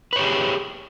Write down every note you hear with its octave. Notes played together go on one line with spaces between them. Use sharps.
G4 G#4 B4 C#5